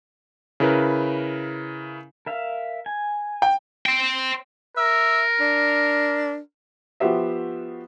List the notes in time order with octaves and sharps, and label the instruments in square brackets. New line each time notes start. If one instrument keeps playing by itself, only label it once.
[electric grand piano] C#3 E4 A#4 B4
[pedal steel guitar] A#4 E5 F5
G#5
[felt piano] G5
[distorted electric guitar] C5 G5
[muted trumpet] A#4 [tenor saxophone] E5
[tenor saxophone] D4
[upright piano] F3 B3 F#4 G4 C5 E5